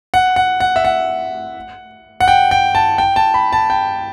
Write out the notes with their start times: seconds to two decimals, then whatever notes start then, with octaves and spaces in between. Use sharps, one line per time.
0.14 F#5
0.36 F#5
0.60 F#5
0.76 E5
0.85 F#5
2.20 F#5
2.28 G5
2.51 G5
2.75 A5
2.98 G5
3.16 A5
3.34 B5
3.52 A5
3.70 G5